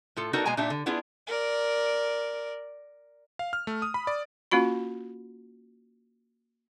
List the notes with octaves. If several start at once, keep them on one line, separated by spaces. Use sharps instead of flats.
A2 F4 A4
B3 D4 D#4 F#4 A4 A#4
B2 G#3 A#3 G#5 A#5
A#2 D4 D#4 G4 E5
D3
B3 D4 E4 F4 G#4
A#4 D5
F5
F6
A3
D#6
B5
D5
A#3 C#4 F4 F#4 B5